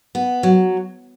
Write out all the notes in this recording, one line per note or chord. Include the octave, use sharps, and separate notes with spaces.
B3
F#3